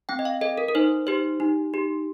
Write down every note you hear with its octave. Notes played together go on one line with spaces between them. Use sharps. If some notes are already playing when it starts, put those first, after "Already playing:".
C4 G5
D#5
F5
A4 D#5
A#4
A#4
D#4 C5
G4 C5
D#4
G4